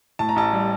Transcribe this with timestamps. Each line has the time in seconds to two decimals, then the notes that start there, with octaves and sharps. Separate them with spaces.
0.19 A2 A5
0.29 A#5
0.36 A1 A5
0.53 G3